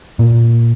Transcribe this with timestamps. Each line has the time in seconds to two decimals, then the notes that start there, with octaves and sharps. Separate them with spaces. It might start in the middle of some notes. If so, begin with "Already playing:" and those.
0.19 A#2